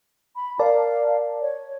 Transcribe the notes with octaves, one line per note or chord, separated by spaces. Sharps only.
B5
A#4 D5 F5 A5
C#5